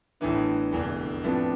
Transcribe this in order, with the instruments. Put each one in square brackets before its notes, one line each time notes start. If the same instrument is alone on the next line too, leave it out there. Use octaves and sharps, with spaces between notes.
[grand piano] A1 A2 E3 B3 [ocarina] D4
[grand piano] F1 E2 D3
[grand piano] A2 F3 B3 D4 [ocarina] C4